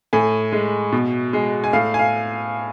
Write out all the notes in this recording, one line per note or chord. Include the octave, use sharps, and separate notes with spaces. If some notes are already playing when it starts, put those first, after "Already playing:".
A2 G#5
G#3
B2
G#3
G#5
A2 F5
G#5
F5